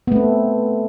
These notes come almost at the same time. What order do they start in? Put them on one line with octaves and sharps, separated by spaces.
B3 A3 C4